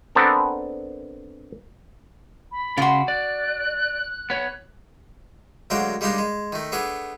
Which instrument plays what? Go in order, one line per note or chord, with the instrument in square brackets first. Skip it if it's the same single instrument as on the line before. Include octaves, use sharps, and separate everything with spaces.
[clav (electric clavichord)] B3 C4 D4 A4 A#4
[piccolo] B5
[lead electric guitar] C#3 C6 [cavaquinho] F4 F#4
[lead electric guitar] D5 [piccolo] F#6
[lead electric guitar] B3 C#5
[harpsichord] D2 F#3 G#3 A#3 D4 G5
G3 G#3 A#3 D4 D#4 G4
G#3
D#3 A3
A3 B3 D4 G#4 A4